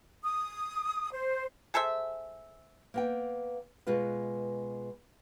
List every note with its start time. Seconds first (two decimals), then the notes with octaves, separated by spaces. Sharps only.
0.23 D#6
1.12 C5
1.74 G#4 A4 C5 E5
2.94 A#3 B3 G5
3.87 B2 G#3 F4 B4